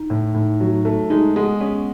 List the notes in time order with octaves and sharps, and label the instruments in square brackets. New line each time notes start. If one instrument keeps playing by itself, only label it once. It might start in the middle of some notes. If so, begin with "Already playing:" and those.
Already playing: [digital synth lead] D#4
[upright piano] A2
A2
F#3
A3
[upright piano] G#3 [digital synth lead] D#4
[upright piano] G#3 [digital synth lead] B3
[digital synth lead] B3 [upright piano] C#4